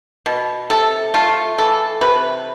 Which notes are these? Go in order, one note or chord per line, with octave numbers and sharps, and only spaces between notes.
B2
C3 A4
A3 F4
E3 A4
C3 B4